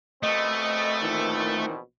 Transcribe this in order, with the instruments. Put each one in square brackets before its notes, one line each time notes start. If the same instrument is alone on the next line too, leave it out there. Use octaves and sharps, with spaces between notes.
[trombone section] A#1 B2 C4 [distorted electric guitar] A3 [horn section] D#5
[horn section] A#2 D#3 E3